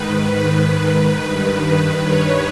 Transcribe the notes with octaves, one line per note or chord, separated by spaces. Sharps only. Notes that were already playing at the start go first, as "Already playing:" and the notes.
Already playing: G#2 D#3 B4
G2 D#3 B4
C#5